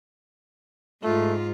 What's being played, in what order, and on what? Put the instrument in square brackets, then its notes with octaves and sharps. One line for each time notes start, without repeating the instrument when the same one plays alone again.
[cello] G#2 [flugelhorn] A3 [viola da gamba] F4